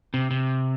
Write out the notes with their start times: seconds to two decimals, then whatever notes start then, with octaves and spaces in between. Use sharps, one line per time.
0.14 C3
0.31 C3